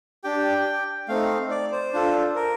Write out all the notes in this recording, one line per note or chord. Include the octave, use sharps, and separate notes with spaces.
D4 G4 G5
A3 C4 D#4 F5
D5
C5
D4 F4 A4
A#4